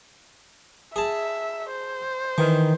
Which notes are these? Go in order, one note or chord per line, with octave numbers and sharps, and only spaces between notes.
G#4 E5 A5
C5
D#3 E3